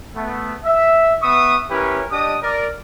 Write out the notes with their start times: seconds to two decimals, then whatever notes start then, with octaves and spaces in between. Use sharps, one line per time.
0.15 A3 B3
0.64 E5
1.22 B3 E5 C#6 D#6
1.71 C#4 E4 G4 A#4 B4 C#5
2.12 D4 G4 D#5 D#6
2.43 A#4 D5